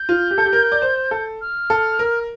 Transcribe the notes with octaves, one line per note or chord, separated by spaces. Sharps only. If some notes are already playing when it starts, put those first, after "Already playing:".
Already playing: G6
F4
G4
A4
G4
A#4
D5
C5
A4
F6
A4
A#4